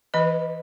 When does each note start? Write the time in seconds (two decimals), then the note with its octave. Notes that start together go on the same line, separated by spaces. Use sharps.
0.14 E3 B4 D#5